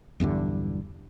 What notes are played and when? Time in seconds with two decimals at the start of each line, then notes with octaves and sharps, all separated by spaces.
0.20 B1 E2 G2 D3